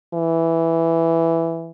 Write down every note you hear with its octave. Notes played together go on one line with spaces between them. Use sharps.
E3